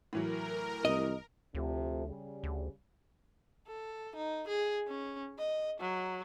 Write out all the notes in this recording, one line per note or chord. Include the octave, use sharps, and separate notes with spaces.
A2 E3 F#3 A#4
C2 D#5
D2 C3 F3 A3
C#3 G3
D2
A4
D#4
G#4
C#4
D#5
F#3